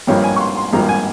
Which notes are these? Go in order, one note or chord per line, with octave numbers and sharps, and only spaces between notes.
G#1 G2 F3 A#3 C#5
G#5
C#6
C6
C6
G#1 G2 F3 A#3 A#5
G#5